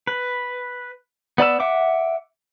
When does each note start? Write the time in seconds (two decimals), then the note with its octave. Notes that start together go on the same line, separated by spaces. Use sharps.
0.07 B4
1.38 B3 D5 B5 E6
1.60 E5 F#5 D6